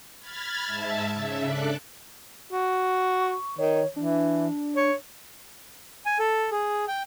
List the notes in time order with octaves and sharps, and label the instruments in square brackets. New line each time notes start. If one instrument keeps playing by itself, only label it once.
[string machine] B5 F6 G#6 A6
G#2 E5 A5
C#3 E5
D4 A4 D5 F#6
[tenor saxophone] F#4
[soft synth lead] C#6
[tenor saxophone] D#3 [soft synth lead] C#5
[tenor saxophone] E3 [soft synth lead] D4
[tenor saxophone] C#5
[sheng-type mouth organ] G#5
A4
G#4
G5